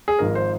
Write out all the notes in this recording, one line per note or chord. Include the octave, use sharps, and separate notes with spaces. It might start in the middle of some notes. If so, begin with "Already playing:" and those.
G#4
G#1 G#2 F3 G#3 A#4
C5